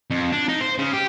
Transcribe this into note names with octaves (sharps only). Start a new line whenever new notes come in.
F2
D4
D#4
C5
C#3
G4